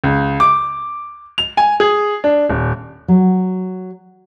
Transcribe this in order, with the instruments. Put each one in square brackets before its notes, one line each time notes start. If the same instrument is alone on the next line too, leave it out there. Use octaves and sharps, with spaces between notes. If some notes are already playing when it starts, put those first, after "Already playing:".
[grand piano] C#2
D6
F7
G#5
G#4
D4
D#1
[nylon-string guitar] F#3